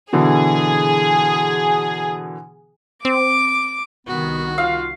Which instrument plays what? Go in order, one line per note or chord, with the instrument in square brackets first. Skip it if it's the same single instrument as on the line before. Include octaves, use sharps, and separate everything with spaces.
[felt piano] B2 D3 E3 [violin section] G#4
[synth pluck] C4 [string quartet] D6
[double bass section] C2 D#3 [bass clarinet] B3 [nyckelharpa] F#4
[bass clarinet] F4 [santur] F5